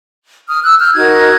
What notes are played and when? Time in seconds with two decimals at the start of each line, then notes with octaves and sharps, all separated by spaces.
0.49 D#6 F6
0.64 E6 F#6
0.80 F6 G6
0.94 D#4 F#4 A#4 F#6 G#6